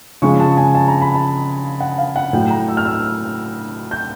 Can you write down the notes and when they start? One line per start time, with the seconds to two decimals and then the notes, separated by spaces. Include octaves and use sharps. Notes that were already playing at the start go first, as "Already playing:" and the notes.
0.22 C#3 F3 G#3 C#6
0.40 A5
0.57 G#5
0.75 A5
0.88 A#5
1.02 B5
1.14 A5
1.80 F#5
1.98 F5
2.16 F#5
2.33 A2 F#3 G5
2.51 A#5
2.68 E6
2.77 F6
2.86 E6
3.91 G6